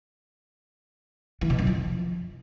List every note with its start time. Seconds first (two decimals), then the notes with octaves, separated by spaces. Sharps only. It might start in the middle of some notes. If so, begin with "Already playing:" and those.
1.41 E3
1.50 B2
1.58 F#2
1.67 F3